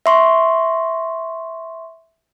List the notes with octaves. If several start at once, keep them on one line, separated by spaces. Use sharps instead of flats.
E5 C6 C#6